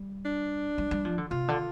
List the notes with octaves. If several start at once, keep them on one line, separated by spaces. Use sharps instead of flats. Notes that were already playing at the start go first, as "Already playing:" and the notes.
Already playing: G3
D4
G3
G3
F3
D3
C3 F4
D3